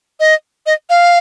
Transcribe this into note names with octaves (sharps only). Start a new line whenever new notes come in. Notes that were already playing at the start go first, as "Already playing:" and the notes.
D#5
D#5
F5